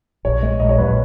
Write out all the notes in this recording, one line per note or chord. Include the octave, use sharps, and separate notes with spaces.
A#1 C#5
G#3
A#1 D#5
C#5
A#1 B4